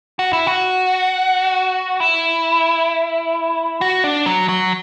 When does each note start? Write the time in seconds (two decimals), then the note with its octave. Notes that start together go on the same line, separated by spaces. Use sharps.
0.19 F#4
0.33 E4
0.47 F#4
2.00 E4
3.81 F#4
4.04 D4
4.26 F#3
4.49 F#3